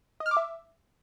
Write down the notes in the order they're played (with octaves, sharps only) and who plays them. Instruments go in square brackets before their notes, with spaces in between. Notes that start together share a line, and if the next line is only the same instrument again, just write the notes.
[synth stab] D#5
F6
D6
E5